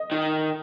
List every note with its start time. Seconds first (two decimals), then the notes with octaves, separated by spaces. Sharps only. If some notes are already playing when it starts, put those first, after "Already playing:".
Already playing: D#5
0.12 D#3